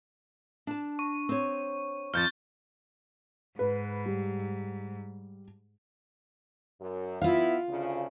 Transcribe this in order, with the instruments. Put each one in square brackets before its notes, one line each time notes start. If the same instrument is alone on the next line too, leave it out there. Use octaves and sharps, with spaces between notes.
[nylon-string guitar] D4 A5
[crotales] C#6
[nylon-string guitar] C4 C#5
[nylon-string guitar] F2 F3 [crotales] F6 G6 A6
[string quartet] G#2 [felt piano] B4
[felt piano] G3
[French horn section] F#2
[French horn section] B3 E4 [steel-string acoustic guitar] F4 F5
[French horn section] D2 C#3